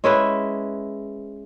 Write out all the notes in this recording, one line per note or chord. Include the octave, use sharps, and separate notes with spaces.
G#3 C#4 E4 B4